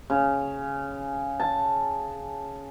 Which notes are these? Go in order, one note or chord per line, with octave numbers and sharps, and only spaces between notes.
C#3
A5